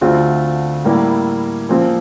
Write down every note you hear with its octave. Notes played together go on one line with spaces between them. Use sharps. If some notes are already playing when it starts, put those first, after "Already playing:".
D2 D3 A3 C4 F4
A2 G3 A#3 E4
A#2 F3 C4 F4